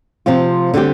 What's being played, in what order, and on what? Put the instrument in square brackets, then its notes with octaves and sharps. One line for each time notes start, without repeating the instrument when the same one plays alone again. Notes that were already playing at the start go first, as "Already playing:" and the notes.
[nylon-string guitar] C3 F3 C4 F4
D3 G3 C4 G4